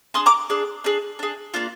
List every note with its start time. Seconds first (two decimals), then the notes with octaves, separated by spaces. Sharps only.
0.14 D4 G#4 C6 D#6
0.26 A#5 D6
0.50 D4 G#4
0.84 D4 G#4
1.19 D4 G#4
1.54 A#3 D4 F4